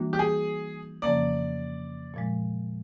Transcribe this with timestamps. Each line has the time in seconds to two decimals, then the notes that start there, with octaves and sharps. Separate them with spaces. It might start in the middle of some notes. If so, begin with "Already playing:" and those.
Already playing: E3 G3 A#3 D4 F#4
0.13 G4
0.19 G#4
1.02 F2 C#3 F3 A#3 C#4 D5
2.14 A#2 F3 G#3